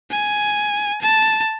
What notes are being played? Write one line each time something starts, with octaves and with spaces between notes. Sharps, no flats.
G#5
A5